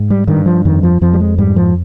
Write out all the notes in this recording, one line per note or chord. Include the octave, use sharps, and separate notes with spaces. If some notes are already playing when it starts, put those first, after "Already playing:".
Already playing: G#2
G3
G2 D#3
F3
F2 D#3
F3
F2 F3
G3
G#3
G#2 G3
F3